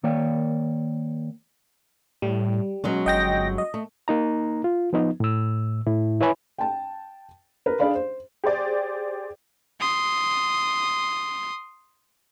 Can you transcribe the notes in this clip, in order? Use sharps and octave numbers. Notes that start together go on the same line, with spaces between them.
D#3 A#3 C#5 D5 G5
A2 G3
B2 F#3 G#3 C#4
G1 D#5 G5 A#6
D#5
A3
A#3 D#4 A#5
F4
F3 B3 D#4
A2 E6
A2 E4
E4 B4 C#5 E5 G#5 B5
G5 A5
A#4 B4
D4 G#4 D5 F5 B5
C5
G4 G#4 C5 D5
C6 D#6